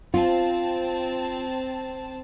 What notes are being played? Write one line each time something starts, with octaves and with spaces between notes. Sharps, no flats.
C4 F4 A5